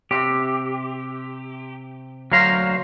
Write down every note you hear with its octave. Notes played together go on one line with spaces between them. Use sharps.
C3 G4
D2 F#3 A#4 C5 F5